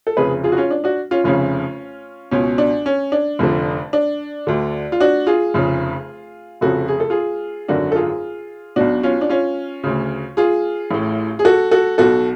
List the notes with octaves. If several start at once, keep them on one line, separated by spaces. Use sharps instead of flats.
A4
F1 F2 C#3 G#4 B4
F4 G#4
F#4
C#4 F4
D4
D4 F#4
C#4 F4
F1 F2 C#3 C#4 F4
C#2 B2 C#4
D4
C#4
D4
F1 F2 D3
D4
D2 D3
F4
D4 F#4
F4 G#4
F1 F2 C#3
F1 F2 C#3 F#4 A4
G#4
A4
F4 G#4
G#1 F#2 D3 D4 F#4
A4
F4 G#4
B1 B2 D4 F#4
C#4 F4
D4
C#4 F4
D2 C#3
F4 G#4
A1 A2
G#4
F#4 A4
F#4 A4
B1 B2 F#4 A4